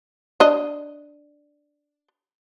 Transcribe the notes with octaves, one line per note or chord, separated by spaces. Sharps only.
D4 D#5